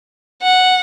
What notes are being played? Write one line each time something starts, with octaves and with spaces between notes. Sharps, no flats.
F#5